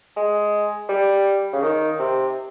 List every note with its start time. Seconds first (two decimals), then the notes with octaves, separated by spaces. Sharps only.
0.16 G#3
0.89 G3
1.53 C#3
1.62 D#3
1.99 C3